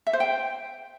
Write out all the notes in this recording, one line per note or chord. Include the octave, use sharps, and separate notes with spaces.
E5
C5
G5